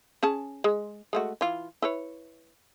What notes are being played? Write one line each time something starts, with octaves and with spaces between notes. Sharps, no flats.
C#4 G#4 A5
G#3
G#3 A3 F#4
E3 F4
E4 B4 C#5